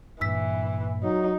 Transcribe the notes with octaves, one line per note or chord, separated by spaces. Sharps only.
G2 A#2 E3 E6 B6
F#3 D#4